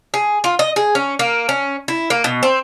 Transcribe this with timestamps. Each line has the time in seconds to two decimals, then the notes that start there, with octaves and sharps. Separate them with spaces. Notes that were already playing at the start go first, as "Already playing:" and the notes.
0.14 G#4
0.44 F4
0.59 D#5
0.76 G#4
0.95 C#4
1.19 A#3
1.49 C#4
1.88 E4
2.10 A#3
2.24 B2
2.43 C4